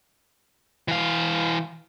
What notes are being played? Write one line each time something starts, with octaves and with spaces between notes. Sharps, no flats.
E3 F5